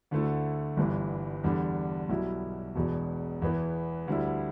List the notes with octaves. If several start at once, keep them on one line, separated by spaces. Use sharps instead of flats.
D2 D3 A3 E4
G1 G2 E3
E2 D3 G3 D4
B1 B2 G3 E4
E1 E2 B2
E2 E3 B3
D2 D3 G3 E4